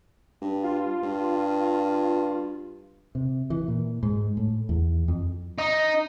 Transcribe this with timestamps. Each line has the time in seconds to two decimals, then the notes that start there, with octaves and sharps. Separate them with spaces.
0.42 G2
0.63 F4
1.02 G2
3.15 C3
3.50 E3
3.68 A#2
4.03 G#2
4.37 A2
4.69 E2
5.08 F2
5.58 D#4